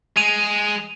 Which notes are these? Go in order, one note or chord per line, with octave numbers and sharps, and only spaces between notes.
G#3 D#7 F7